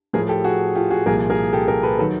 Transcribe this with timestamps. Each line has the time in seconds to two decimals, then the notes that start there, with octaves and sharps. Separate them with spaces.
0.13 A2 F3 G#4 A#4
0.29 G4 A4
0.44 F#4 G#4
0.75 F4 G4
0.91 F#4 G#4
1.06 C2 A#2 F3 G#4 A#4
1.30 G#4 A#4
1.53 G4 A4
1.68 G#4 A#4
1.83 A4 B4
1.99 D#3 F#3 A4 B4